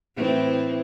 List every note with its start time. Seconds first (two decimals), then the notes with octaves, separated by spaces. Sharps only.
0.16 A2 E3 C4